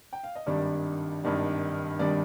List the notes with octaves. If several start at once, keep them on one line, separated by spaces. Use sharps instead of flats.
G5
F5
D#5
G#1 G2 D#3 G3 D4 D5
G#1 G2 D#3 G3 D4
G#1 D#3 G3 D4 D5